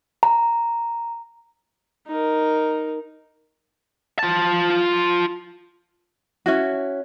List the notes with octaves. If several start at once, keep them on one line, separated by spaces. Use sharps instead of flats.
A#5
D#4 A#4
F4 A5
C#4 E4 F#4